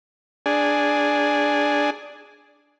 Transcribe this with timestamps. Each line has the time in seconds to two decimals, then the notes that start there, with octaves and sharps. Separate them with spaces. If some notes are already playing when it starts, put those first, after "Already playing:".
0.46 D4 G#4